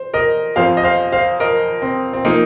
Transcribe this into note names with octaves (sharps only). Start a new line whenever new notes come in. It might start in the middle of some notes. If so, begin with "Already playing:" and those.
Already playing: C5
A#4 D#5
F2 F3 C5 F5
D#5
C5 F5
C5 F5
A#4 D#5
C4
C4
F3 A#3 D#4